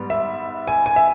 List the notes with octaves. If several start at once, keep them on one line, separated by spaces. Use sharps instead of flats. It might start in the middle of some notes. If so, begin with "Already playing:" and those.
Already playing: G#2 G3 B3
E5
G#5
G#5
E5